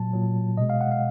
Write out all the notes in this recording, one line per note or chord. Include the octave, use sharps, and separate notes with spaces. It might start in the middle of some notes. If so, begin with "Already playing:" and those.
Already playing: A#2 F#3 A5
A#2 F#3
B2 G#3 D#5
F5
F#5
F5